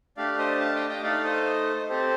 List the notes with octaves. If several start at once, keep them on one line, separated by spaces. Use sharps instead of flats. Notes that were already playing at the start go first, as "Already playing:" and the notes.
A3 D4 G4 D5 F5
C5 D#5
F5 A5
D#5 G5
D#5 G5
A3 D#4 A4 D5 F5
C5 D#5
C4 G4 A4 C5